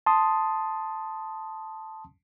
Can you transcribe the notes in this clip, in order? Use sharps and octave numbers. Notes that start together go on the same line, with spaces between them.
A5 C6 D#6